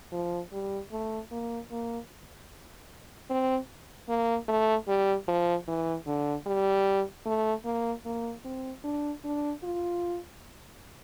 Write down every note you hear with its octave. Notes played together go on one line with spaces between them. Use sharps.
F3
G3
A3
A#3
A#3
C4
A#3
A3
G3
F3
E3
D3
G3
A3
A#3
A#3
C4
D4
D4
F4